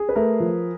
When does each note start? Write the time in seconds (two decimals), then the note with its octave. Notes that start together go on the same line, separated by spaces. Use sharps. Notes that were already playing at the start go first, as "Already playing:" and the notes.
Already playing: G#4
0.09 B4
0.15 A3 A#4
0.40 F3